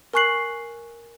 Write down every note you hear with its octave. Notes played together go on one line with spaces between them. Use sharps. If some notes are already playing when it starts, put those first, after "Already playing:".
A#4 G#5 C#6 F#6 C7 F#7